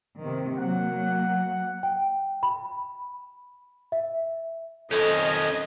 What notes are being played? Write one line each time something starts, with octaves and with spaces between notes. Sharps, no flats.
C3 D#3
F#3 A#3 F#5
G5
B5
E5
F2 D#3 C#4 A4 D#5